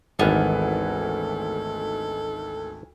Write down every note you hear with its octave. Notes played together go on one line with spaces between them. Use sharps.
G#1 D2 D#3 E3 B3 A4